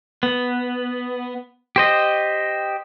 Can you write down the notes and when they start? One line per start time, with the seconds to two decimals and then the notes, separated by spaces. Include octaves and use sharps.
0.23 B3
1.76 G4 C5 D#5